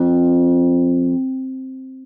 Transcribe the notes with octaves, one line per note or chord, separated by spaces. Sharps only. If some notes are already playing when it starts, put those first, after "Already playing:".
Already playing: F2